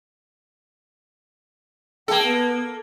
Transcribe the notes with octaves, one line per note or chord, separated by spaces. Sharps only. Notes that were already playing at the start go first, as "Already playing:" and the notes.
A#3 G#4 A4 G5 A5
B3